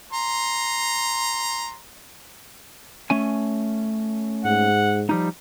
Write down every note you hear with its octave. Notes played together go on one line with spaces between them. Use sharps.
A#5 C6
A3 C#4 G#5
G#2 F#5
F3 G3 D#4